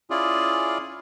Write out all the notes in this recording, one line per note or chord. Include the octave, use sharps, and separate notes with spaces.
C#4 E4 F4 G#4 D5